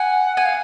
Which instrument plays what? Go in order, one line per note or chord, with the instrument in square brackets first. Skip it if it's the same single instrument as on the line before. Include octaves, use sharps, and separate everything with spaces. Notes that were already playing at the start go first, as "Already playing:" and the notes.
Already playing: [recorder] F#5 [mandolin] G#5
[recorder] F#5 [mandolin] G#5
[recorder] F5